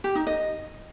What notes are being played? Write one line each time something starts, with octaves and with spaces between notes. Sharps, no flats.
G4
D#4
D#5